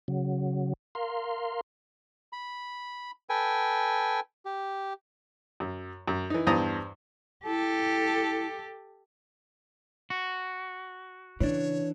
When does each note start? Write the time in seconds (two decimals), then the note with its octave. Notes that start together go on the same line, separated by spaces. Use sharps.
0.08 C#3 F#3
0.95 A#4 F5 C6
2.33 B5
3.29 A4 B4 G5 G#5
4.45 G4
5.60 F#2
6.08 F#2
6.30 E3 D#4
6.47 E2 G2 C5 A5 A#5 D#6
7.46 E4 G4 A4
10.10 F#4
11.40 C#3 E3 D4 C#5